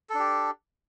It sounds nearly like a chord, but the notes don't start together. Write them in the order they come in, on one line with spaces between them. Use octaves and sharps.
A4 D4 G4